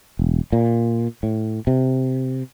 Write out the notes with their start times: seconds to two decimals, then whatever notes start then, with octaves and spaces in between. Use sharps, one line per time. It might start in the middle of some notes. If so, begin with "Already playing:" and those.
0.19 E1
0.52 A#2
1.23 A2
1.67 C3